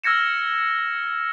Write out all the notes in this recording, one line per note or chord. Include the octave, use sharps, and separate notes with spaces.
E6 F6 G#6 A#6 C#7 E7